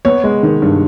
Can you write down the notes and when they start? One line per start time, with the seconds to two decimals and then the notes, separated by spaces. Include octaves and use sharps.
0.05 B3 C#5
0.24 G#3
0.43 D#3
0.62 G2